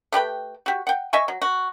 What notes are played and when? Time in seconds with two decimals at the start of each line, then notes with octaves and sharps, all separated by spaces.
0.12 A3 G4 B4 G5
0.66 F#4 G4
0.87 F#5 G5
1.13 D#5 E5 G#5 C#6
1.28 F#3
1.42 F#4